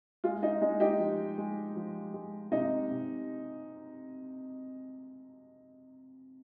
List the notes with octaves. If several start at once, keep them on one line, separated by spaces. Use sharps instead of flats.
G#3 F4
D#4
G#3 D#4
D#4 G4
F3
G#3
F3
G#3
C3 D#4
C3